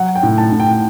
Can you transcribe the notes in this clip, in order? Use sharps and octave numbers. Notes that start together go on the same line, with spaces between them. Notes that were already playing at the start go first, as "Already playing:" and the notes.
Already playing: F#3 F#5
G5
A2
A5
A2
G5